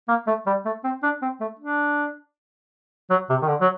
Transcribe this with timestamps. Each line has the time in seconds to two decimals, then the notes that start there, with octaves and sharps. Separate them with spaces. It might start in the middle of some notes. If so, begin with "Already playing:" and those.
0.08 A#3
0.27 A3
0.47 G3
0.65 A3
0.84 C4
1.03 D4
1.22 C4
1.40 A3
1.59 D4
3.10 F#3
3.30 C3
3.42 D#3
3.48 D3
3.61 F#3